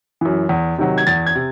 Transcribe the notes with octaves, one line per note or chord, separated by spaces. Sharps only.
F#2 E3
E2
C3 D#3 F#3
G#6
E2 A6
G#6
C3